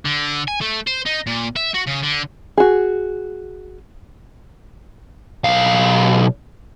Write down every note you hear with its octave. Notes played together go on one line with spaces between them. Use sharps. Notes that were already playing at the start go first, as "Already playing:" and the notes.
D3
G#5
A3
C5
D#4
A#2
E5
F#4
C#3
D3
F#4 G#4
B1 F5